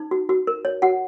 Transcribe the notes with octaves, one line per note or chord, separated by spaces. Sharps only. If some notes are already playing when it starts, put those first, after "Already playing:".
Already playing: D#4
F#4
F#4
A#4
C#5
F#4 F#5